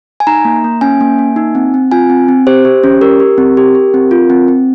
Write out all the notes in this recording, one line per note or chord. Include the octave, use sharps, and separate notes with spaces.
G#5
D#4 A#5
A#3
A#3
C#4 G#5
A#3
A#3
D#4
C4
C4
F4 G#5
C4
C4
G4 C5
G4
C#4
G4 A#4
G4
C4
G4
G4
C4
F4
C4
C4